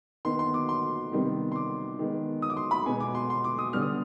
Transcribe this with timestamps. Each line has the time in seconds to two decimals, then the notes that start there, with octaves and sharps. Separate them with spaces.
0.25 D#3 B3 C6
0.39 C6
0.54 D6
0.69 C6
1.12 C3 D#3 G3 B3
1.52 C6
1.56 D6
1.99 D#3 G#3 B3
2.42 D#6
2.50 D6
2.57 C6
2.71 B5
2.86 B2 G#3 B3 G#5
3.00 D6
3.15 C6
3.30 C6
3.44 D6
3.59 D#6
3.73 D3 G3 B3 F6
3.82 D#6